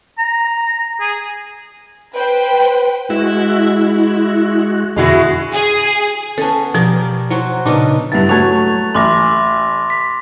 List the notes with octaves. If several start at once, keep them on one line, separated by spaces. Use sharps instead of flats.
A#5
G#4
B4 C5 G5
G#3 E4 F#4
F2 B2 D3 G#3 E4 F#4
G#4
B3 C#4 A4 A5
B2 F3 G4 A#4 D5
F#3 F#4 C5
A#2 C#3 B3 D4 D#4
G2 B3 E4 A6
F#3 A3 C#6 G#6 F7
A1 C6 D6 A#6
B6